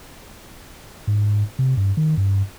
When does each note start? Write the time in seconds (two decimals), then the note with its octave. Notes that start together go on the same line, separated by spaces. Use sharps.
1.07 G#2
1.59 C3
1.77 G2
1.97 D#3
2.17 G2